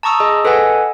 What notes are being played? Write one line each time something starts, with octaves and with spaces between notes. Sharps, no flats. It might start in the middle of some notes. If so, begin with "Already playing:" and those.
A5 A#5 C#6 D#6 E6
G#4 D#5
A4 B4 D#5 F#5 G#5